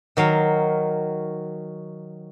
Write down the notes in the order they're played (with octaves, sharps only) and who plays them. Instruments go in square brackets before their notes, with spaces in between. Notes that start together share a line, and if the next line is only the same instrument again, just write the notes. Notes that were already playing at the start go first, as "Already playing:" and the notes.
[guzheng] D#3 F#3 F5